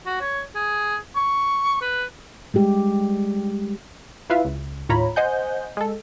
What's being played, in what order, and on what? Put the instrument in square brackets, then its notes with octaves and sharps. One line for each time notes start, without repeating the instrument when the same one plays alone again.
[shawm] F#4
C#5
G#4
C#6
B4
[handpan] G3 G#3 G4
[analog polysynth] E4 F4 B4 E5 F5
C#2
D#2 A2 F4 C#5 A#5 B5
C5 D#5 F#5 G#5 G6
G#3 A4